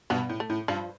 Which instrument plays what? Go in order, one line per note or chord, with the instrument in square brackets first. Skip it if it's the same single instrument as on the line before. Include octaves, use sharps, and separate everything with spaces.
[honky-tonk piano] G2 B2 [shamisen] B3
[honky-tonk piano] A2
[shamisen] A3
[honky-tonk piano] A2
[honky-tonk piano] G2 [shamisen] F3